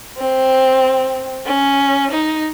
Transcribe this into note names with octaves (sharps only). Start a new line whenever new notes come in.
C4
C#4
D#4